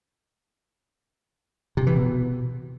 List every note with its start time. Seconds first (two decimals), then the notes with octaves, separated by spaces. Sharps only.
1.77 C3
1.87 E3
1.96 B2